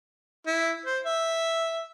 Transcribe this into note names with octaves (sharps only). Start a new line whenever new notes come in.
E4
C5
E5